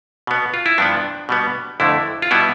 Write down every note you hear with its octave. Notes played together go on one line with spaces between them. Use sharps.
B2 B3
F4
E4
G2 F3 B3 D4
B2 G3 B3
F2 D3 A3 E4
F4
B2 G3 B3 E4